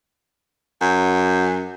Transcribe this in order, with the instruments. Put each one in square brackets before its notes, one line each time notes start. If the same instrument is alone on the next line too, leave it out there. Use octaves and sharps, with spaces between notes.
[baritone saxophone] F#2